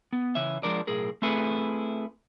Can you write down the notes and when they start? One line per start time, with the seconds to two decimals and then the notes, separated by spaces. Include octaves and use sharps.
0.13 B3
0.35 C#3 E3 C#4 E5
0.63 F3 G#3 D4 A#4 D5
0.87 B1 A2 G#4 A#4
1.22 A3 C4 E4 G#4 A4 B4